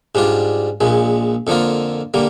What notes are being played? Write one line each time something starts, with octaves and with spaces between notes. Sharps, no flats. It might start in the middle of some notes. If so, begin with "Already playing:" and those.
G#2 G3 D4 F4
A#1 A#2 G#3
F2 D3 F3 A#3 F4
D3 G3 A#3